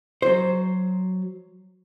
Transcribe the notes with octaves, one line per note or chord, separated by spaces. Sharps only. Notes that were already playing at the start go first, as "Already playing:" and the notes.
F#3 C5